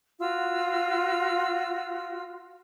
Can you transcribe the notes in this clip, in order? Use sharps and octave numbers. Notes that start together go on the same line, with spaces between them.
F4 F#4 E6